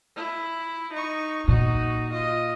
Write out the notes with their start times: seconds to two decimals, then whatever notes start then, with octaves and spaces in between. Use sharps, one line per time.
0.16 E4
0.93 D#4 C#6
1.48 A#2 D#4 F#4
2.13 F4 D#5